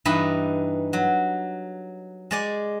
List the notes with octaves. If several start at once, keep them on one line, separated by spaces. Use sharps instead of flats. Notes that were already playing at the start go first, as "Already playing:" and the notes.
G2 E3 D#4 D#5 B5
F#3
G#3 D5 G#5